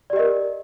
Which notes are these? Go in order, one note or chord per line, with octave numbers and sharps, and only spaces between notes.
G4 A#4 D5 D#5